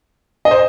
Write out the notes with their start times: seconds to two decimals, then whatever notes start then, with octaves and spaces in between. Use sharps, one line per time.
0.45 D#5
0.51 C5